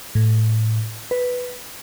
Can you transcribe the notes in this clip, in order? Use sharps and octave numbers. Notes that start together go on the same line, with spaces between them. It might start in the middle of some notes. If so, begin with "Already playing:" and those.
A2
B4